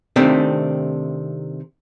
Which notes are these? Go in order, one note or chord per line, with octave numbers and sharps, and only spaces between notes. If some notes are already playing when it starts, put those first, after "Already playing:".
C3 D#3 A3 C4 D4